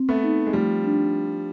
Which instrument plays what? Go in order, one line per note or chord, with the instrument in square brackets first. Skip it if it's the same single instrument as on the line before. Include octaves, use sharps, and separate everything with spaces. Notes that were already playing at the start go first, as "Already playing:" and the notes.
Already playing: [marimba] C4
[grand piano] A3 B3
[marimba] D#4
[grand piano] G#3
[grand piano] F3 G3 [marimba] A3
[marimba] D4